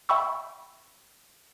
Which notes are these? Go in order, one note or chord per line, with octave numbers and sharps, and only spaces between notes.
E5 G5 B5 C#6 E6